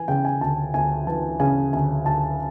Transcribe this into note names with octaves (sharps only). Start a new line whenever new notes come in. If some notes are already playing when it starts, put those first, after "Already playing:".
Already playing: E3 G#5
C#3 G5
G#5
D2 A5
D2 G#5
E3 A5
C#3 G#5
D2 G#5
D2 A5